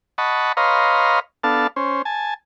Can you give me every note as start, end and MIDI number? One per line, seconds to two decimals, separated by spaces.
0.18 0.52 75
0.18 0.52 78
0.18 0.52 81
0.18 0.52 83
0.18 0.52 85
0.57 1.20 71
0.57 1.20 73
0.57 1.20 75
0.57 1.20 77
0.57 1.20 82
0.57 1.20 84
1.44 1.67 59
1.44 1.67 62
1.44 1.67 69
1.44 1.67 77
1.44 1.67 81
1.76 2.02 61
1.76 2.02 72
2.05 2.34 80
2.05 2.34 81